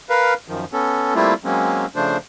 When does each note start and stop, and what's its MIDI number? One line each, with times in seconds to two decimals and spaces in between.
0.10 0.34 70
0.10 0.34 71
0.10 0.34 77
0.48 0.65 42
0.48 0.65 51
0.48 0.65 53
0.73 1.14 59
0.73 1.14 61
0.73 1.14 69
1.15 1.34 55
1.15 1.34 57
1.15 1.34 58
1.15 1.34 60
1.15 1.34 64
1.15 1.34 65
1.45 1.86 54
1.45 1.86 56
1.45 1.86 58
1.45 1.86 60
1.45 1.86 61
1.96 2.17 49
1.96 2.17 53
1.96 2.17 57
1.96 2.17 62
1.96 2.17 72